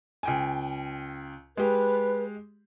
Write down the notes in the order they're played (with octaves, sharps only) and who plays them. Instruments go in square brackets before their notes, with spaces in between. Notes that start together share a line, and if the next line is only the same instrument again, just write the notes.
[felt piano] C#2 G5 G#5
[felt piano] G#3 G4 [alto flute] B4